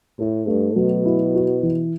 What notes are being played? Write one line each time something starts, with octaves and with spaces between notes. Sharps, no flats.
A2 A4
G2 A3
B2 F#3
E4
F#4
E3